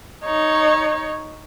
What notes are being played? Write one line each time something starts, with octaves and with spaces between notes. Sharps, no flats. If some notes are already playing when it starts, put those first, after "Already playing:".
D#4 C#5